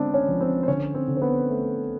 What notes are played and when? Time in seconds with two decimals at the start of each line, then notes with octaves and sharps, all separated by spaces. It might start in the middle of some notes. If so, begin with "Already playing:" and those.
Already playing: D3 G#3 B3 C4 D4 D5
0.14 C#4 C#5
0.28 F3
0.41 C4 C5
0.63 C5
0.68 D3 C#4 C#5
0.95 C4 C5
1.08 D3
1.17 C5
1.22 B3 B4
1.49 A3